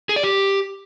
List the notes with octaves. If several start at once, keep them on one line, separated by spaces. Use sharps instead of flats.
G#4
D5
G4